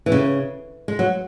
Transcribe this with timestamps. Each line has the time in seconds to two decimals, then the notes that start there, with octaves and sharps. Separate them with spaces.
0.06 E3
0.12 C#3
0.88 G#3
0.99 F#3